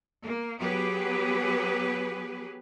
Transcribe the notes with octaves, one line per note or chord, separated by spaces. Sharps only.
A#3
F#3 B3 G4 G#4 B4